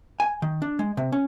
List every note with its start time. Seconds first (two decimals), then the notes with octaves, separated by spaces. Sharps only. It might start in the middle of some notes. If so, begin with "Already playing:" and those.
0.20 G#5
0.42 D#3
0.62 D4
0.79 G#3
0.97 C3
1.12 C#4